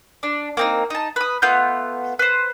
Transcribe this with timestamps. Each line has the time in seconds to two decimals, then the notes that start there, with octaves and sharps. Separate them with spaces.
0.23 D4
0.57 A#3 C4 D#4
0.90 D#4 A5
1.16 B4 D#6
1.42 A3 B3 F4 G6
2.19 B4 C5